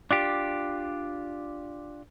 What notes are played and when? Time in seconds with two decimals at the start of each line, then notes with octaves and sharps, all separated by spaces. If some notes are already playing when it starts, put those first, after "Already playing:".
0.11 D4 F4 G4